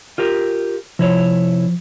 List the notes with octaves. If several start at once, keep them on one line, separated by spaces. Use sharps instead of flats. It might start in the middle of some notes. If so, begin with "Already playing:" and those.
F4 G4 A#4
C3 F3 E4 C#5